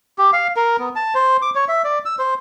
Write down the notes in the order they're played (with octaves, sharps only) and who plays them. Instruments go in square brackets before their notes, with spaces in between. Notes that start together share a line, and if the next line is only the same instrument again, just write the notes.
[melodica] G4
F5
A#4
B3
A5
C5
D6
C#5
E5
D5
E6
C5